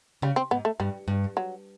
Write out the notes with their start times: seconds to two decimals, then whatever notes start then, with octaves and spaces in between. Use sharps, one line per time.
0.22 C#3 G3
0.36 C4
0.51 G#2 B3
0.65 A3
0.80 G2 G3
1.08 G2
1.37 F#3